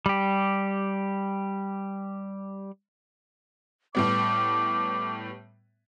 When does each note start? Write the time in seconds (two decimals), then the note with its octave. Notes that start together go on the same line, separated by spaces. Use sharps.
0.06 G3 G4
3.95 A2 G3 B3 D6